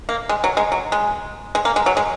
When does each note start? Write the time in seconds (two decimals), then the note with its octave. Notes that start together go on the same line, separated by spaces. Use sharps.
0.09 A#3
0.29 G#3
0.44 F#3
0.57 G#3
0.72 F#3
0.92 G#3
1.55 G#3
1.65 A#3
1.76 G#3
1.86 F#3
1.97 G#3